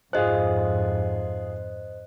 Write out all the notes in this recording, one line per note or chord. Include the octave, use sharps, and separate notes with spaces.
F2 G#2 F4 G#4 C5 D#5 F#6